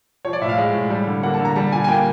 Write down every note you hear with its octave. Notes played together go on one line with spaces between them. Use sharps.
F3 C#5
D5
A2 E5
F5
G#3
A2
G3
D3
A#3 F#5
A5
D3
A#5
G3 A5
A#2 G#5
G#5
A#3 G5